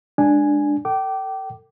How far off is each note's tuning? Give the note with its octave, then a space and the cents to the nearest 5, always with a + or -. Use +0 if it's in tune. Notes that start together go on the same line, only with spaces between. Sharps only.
G#3 -10 D4 +5 G#5 +0
A4 +30 G5 -30 D6 +0